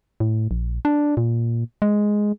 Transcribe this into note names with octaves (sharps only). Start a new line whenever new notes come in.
A2
A#1
D4
A#2
G#3